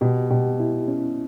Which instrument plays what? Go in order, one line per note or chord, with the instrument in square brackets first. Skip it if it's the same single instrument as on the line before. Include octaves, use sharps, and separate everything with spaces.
[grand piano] B2 [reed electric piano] G4
[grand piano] B2 [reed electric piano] G4
[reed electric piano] E4
C#4